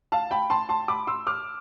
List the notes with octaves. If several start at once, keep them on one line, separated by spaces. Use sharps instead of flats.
F5 A5
G5 B5
A5 C6
A5 C6
B5 D6
C6 E6
D6 F6